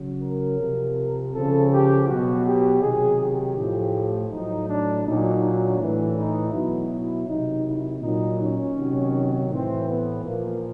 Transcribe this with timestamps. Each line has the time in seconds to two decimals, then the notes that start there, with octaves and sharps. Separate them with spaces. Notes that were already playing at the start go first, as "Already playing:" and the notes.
Already playing: C#3 F#3
0.22 A#4
0.60 C3 F3
1.34 C#3 F3 A4
1.71 G4
2.08 B2 F#3 F#4
2.45 G4
2.82 C3 D#3 F#3 G#4
3.19 G4
3.56 A2 F3
4.30 A2 F#3 D#4
4.67 D4
5.05 A#2 F#3 D#4
5.42 D4
5.79 A2 E3
6.17 D#4
6.53 B2 F#3 E4
6.91 E4
7.27 C3 D#3 F#3 D#4
7.65 E4
8.01 A#2 F#3 D#4
8.38 C#4
8.76 C3 D#3 F#3
9.50 A2 E3 C4
9.87 B3
10.24 A#2 F3 A#3